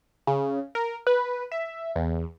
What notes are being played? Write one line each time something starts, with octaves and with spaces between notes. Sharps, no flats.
C#3
A#4
B4
E5
E2